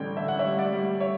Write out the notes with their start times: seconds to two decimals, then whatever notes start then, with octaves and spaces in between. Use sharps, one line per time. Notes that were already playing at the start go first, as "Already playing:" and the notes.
Already playing: A1 D3 G3 G5
0.17 D3 E5
0.28 F#5
0.39 C#5 E5
0.44 G3
0.59 D5 F#5
0.72 G3
1.00 C#5 E5